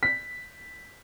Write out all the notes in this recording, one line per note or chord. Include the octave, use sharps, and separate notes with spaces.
B6